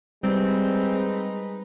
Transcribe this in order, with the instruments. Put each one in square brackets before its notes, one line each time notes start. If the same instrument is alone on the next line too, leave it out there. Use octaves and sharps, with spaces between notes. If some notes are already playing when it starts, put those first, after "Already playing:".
[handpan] G3 [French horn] G#3 [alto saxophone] C4 [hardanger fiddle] D#4 B4